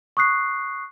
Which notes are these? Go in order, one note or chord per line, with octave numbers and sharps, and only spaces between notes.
C#6 D#6 F#6 C7